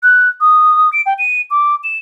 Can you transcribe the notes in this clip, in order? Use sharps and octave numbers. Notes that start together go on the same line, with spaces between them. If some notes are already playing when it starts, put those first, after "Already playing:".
F#6
D#6
D7
G5
D#7
D6
E7